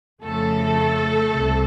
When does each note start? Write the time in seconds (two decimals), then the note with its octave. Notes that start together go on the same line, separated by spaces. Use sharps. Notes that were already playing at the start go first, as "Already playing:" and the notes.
0.23 F2 C#3 F3 A3 A4
1.35 C2 C3